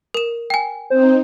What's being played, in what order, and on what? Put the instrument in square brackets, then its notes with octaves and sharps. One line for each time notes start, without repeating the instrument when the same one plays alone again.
[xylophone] A#4 E7
G5 G#5
[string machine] C4 D#4 [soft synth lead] C5